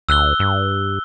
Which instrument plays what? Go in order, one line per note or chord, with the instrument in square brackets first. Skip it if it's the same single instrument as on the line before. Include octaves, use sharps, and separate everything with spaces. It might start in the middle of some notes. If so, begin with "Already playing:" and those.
[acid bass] D2 [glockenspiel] E6 F#6 G7
[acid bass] G2